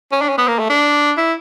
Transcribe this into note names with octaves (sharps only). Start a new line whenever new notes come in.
C#4
D4
C#4
B3
A#3
A3
D4
E4